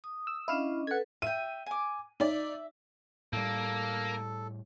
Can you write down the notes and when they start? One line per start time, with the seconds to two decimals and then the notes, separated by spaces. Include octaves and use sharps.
0.04 D#6
0.27 E6
0.48 C#4 D4 E4 D#5 F5
0.87 A4 B4 F#5 G#6
1.22 E5 G5 D#7
1.66 G#5 D6
2.20 D#4 D5 E5
3.33 A2 G3 A#3 A4